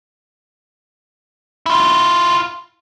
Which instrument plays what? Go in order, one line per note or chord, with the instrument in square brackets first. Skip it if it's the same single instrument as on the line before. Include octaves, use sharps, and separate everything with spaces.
[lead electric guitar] E4 F4